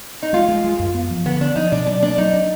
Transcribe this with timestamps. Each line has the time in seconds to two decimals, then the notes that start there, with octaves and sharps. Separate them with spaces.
0.23 D#4
0.33 G#3 F4
0.48 G#3
0.64 G#3
0.79 F#2
0.94 B3
1.10 F3
1.26 D3 B3
1.41 B3 D4
1.56 F3 D#4
1.72 B2 D4
1.87 F#3 D4
2.02 A#3 D4
2.18 F#3 D#4
2.33 D4